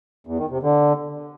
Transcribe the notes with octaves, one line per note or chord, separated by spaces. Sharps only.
E2
D#3
C3
D3